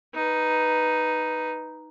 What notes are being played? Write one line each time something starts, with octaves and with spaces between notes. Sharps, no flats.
D#4 B4